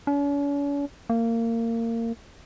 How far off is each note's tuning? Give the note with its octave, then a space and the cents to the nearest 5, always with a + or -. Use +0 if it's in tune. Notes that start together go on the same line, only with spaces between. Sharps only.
C#4 +45
A#3 -25